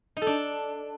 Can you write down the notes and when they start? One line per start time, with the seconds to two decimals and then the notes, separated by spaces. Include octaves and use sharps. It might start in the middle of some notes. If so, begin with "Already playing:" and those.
0.17 D#4
0.22 A4
0.27 D4